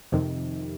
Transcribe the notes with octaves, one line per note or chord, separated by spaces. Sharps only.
F2 C3 D#3